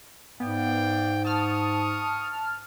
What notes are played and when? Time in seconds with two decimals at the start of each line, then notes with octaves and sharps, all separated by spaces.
0.40 G#2 B3 D5 F5 G5
1.25 A5 C#6 D#6 F6